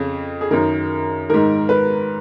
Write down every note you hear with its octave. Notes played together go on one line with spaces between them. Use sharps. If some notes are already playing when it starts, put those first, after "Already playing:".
Already playing: F2 C#3
G#4
F#2 D#3 A#4
G#2 D#3 A#4
B4